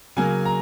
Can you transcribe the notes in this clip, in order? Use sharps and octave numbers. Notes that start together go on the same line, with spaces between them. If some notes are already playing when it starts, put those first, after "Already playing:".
C#3 F#3 A#3 G#5
A#5